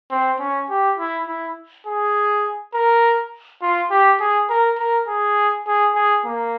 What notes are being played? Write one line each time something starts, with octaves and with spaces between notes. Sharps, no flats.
C4
C#4
G4
E4
E4
G#4
A#4
F4
G4
G#4
A#4
A#4
G#4
G#4
G#4
A#3